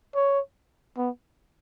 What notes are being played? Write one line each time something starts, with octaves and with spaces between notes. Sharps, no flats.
C#5
B3